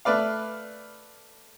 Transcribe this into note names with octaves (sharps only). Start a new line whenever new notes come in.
A3 B4 D5 F5